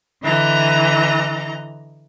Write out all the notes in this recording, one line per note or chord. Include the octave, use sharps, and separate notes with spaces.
D3 E3 D#5 A#5